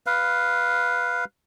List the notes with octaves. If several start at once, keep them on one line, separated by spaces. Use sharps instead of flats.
B4 F5